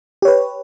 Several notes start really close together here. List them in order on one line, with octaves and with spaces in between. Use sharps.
G4 C#5 B4